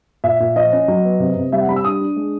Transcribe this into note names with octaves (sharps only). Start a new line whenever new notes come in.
A#2 E5
A#2
F3 D#5
C#4
F#3
B3
C3
C3
G3 E5
F#5
G3 B5
E6
D4 D#6
D4
G#3